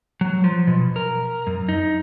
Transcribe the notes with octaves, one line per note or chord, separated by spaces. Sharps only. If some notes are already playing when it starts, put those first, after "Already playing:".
F#3
F3
B2
A#4
F#2
D#4